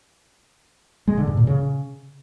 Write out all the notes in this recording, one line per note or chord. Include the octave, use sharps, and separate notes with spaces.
G#3
D3
G2
A#2
C#3